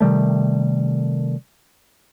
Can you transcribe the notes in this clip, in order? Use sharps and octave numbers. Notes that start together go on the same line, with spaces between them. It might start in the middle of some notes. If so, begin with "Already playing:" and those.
C3 D#3 G3 A3